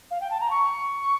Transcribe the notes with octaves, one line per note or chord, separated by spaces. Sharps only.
F5
G5
A5
A#5
C#6